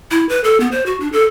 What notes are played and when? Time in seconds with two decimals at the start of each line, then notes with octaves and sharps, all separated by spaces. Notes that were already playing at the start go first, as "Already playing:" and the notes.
0.11 E4
0.29 B4
0.44 A4
0.60 B3
0.72 C5
0.86 F#4
1.00 D4
1.12 A4